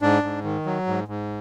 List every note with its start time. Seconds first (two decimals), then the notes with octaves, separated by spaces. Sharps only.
0.02 G#2 D4
0.23 G#2
0.44 D#3
0.66 F#3
0.87 G#2
1.08 G#2